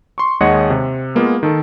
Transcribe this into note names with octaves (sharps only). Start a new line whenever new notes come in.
C6 C#6
D#2 G#3 C#5 D#5 F#5 C#7
C3
G#3 A#3 B3 F4
D#3 A4